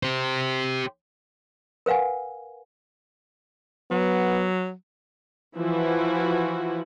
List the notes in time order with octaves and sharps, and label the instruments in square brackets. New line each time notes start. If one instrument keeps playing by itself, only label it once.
[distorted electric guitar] G4 C5
[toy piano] A#4 B4 F5 F#5 G#5
[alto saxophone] F#3 [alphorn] B3
[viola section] E3 F3 E4 F#4